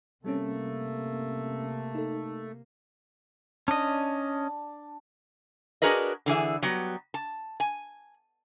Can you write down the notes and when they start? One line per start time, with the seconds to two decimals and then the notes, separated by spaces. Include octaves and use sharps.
0.25 C3 G3 A3 A#3 C4 C#4
1.95 D#4 A4
3.68 C#4 D4 D#5
5.82 D4 F#4 G#4 A#4 B4 D#5
6.26 D3 E3 G#4 E5
6.62 F#3 G3 B3
7.14 A5
7.60 G#5